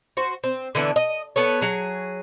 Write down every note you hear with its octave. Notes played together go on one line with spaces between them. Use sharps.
F#4 C5
C4
D3 E3 B3 D4
D#5
B3 A4 C#5
F#3 G#4